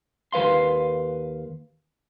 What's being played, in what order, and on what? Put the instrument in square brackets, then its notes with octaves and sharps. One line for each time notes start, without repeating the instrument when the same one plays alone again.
[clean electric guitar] D#2 B4 F5 C6